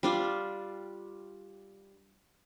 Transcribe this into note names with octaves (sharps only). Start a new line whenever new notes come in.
G3 D4 F4